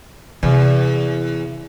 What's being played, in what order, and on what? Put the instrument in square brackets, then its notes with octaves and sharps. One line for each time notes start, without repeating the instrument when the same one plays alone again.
[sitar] E2 [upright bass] C3